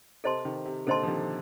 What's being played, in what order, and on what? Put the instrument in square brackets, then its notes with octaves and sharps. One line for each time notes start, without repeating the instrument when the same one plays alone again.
[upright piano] C3 [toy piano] A4 C5 D#5 A5 C6
[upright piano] C3 D#3
C3
[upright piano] A#2 D3 [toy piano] A4 C5 D#5 A5 C6
[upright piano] F3
C3 D#3